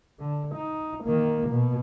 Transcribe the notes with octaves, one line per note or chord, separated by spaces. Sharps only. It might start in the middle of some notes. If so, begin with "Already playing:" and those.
D3
D#4
D#3 A#3
B2